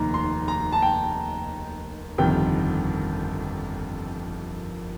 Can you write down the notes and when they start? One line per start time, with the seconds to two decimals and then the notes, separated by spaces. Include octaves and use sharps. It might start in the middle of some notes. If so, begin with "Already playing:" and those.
Already playing: F1 D#2 D#3 A#5
0.14 C6
0.48 A#5
0.73 A5
0.82 G5
2.18 G1 F2 C3 D#3 G5